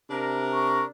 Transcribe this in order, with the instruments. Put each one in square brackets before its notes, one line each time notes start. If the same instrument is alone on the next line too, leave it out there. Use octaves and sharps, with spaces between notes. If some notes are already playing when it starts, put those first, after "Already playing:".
[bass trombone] C3 [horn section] D4 A#4
[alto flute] C#6